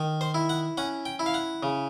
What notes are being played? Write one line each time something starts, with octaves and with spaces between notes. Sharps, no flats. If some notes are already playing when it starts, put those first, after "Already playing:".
Already playing: D#3
C5
E4
F#5
C#4 F#5
G5
E4
F5
F#5
C#3